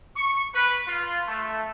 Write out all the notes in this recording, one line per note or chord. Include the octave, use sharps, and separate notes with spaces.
C#6
B4
F4
A3